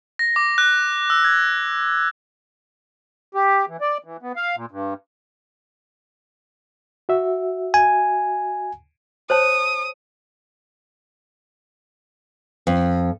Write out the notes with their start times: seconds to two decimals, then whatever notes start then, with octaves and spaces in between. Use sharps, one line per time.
0.19 A#6
0.36 D6
0.58 F#6
1.10 E6
1.24 G#6
3.34 G4
3.68 E3
3.81 D5
4.04 E3
4.22 B3
4.36 F5
4.56 A#2
4.71 G2
7.09 F#4 E5
7.74 G#5
9.30 C5 C#5 A5 D#6
12.67 F2